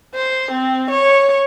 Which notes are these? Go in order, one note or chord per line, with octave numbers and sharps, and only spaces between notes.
C5
C4
C#5